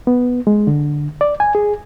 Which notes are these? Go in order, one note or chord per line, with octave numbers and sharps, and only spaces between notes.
B3
G#3
D3
D5
G#5
G#4